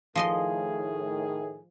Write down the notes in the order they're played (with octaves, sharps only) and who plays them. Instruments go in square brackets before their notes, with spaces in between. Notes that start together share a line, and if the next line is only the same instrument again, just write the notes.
[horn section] A2 D#3 G#4 [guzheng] F3 D#5 C6